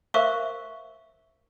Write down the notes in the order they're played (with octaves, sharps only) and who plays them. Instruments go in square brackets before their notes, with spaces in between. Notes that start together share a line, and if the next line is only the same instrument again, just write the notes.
[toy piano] A#4 C5 E5 F5 C#6 D6